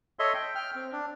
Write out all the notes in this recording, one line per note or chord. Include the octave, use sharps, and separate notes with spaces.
A4 C#5 D#5 E5 C6
G5
G5 F6
C4
D4